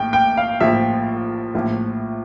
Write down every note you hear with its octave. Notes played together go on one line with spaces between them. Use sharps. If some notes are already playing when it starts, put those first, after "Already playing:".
Already playing: A#1 A2 G5
G5
F5
A#1 A2 F3 E5
A#1 A2 F3